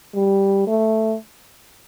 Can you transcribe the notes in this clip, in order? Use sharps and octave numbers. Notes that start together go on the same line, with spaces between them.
G3
A3